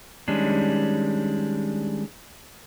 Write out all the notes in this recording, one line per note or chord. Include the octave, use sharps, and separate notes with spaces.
D#3 G3 G#3 C#4 D4